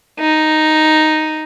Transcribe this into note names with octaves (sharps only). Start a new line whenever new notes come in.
D#4